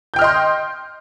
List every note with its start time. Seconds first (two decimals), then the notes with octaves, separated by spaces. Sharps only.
0.14 G6
0.16 G5
0.19 F6
0.21 D#5
0.24 C6